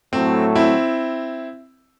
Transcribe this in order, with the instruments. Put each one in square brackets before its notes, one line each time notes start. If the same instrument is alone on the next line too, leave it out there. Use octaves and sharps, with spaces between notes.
[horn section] A2 F#3 A3 [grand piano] C4
[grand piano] C4 E4